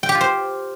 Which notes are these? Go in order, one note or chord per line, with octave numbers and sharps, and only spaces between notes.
G5
G4
F4
C5